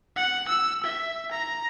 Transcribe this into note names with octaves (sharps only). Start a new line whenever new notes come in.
F#5
E6
E5
A#5